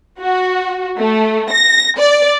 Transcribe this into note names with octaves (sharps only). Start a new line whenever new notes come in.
F#4
A3
A#6
D5